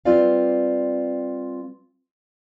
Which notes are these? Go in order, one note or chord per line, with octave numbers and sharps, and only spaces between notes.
G3 C4 F4 B4 D5 F5